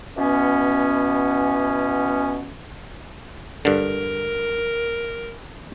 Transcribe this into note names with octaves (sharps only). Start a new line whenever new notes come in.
B2 E3 B3 C#4
G2 D3 A#4